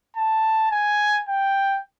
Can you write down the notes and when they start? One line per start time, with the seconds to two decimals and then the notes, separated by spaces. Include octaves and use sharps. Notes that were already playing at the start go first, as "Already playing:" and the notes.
0.17 A5
0.72 G#5
1.29 G5